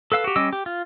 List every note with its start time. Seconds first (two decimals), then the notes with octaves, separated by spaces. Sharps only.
0.12 A4 B4 F5 E6
0.24 F#4 G4
0.36 G3 C#4 D#5 D6 E6
0.53 G4
0.66 F4